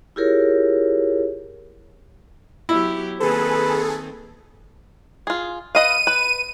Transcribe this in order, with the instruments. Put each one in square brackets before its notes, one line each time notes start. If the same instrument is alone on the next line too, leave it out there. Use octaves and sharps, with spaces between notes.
[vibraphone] E4 F4 G4 G#4 A#4 C#5
[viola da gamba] F#3 B3 G4 [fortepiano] E4
[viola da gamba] D#3 A#3 C4 [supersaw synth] G#4 A4 [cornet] B4
[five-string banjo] F4 G#4
[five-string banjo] B4 D#5 F5 [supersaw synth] D#7
[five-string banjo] B4